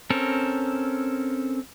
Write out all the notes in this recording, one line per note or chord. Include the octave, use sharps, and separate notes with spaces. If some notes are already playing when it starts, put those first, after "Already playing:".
C4 C#4 A4 A#4